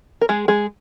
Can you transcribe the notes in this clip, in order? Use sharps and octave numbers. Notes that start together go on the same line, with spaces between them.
A#4
G#3 G#4
G#3 G#4